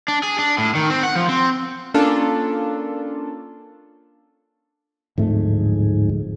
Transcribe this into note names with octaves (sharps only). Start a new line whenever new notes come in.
D4
G#4
D4
A2
D#3
C4
F#5
F3
C4
A#3 C#4 D4 F4 A4
D1 F2 G#2 A3